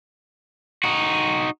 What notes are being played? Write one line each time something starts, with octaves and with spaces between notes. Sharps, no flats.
D#4 F#4